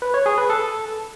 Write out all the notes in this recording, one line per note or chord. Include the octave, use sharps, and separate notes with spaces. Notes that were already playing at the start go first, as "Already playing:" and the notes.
B4
C#5
G#4
B4
A4